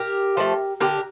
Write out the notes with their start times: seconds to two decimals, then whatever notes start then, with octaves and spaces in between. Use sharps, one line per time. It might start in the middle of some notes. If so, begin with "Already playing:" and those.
Already playing: G4 A#4
0.37 F3 A3
0.80 D3 G4 A#4